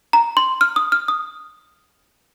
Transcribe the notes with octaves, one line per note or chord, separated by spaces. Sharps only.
A#5
C6
F6
D#6
F6
D#6